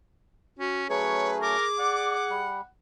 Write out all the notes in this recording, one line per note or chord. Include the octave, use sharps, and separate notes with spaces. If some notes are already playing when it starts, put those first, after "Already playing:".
C#4 F#4
F#3 A3 C#4 G#4 B4 C#5
A#4 D6
D5 F#5
G3